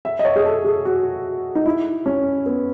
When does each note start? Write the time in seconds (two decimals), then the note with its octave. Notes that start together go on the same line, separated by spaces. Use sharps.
0.05 E5
0.19 D#5
0.25 C#5
0.36 G#4
0.45 A4
0.65 G#4
0.85 F#4
1.55 D#4
1.66 E4
2.06 C#4
2.46 B3